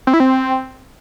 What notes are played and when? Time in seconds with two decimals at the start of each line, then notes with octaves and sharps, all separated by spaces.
0.07 C4
0.14 E4
0.20 C4